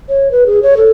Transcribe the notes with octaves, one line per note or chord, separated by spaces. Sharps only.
C#5
B4
G#4
C#5
A4